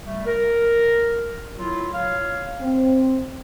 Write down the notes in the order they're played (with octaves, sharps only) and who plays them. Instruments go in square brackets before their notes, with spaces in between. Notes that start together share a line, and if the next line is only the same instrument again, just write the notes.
[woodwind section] G3 A3
A#4
F#3 E4 F4
C#5 F5
[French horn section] C4